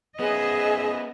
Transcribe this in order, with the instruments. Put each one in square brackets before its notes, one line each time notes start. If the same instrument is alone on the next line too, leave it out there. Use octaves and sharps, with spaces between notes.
[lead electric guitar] B3 C#4 [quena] G#4 [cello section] D#5 E5